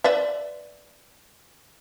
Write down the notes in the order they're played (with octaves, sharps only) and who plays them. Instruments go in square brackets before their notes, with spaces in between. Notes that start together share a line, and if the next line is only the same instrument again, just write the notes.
[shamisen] B4 D5 E5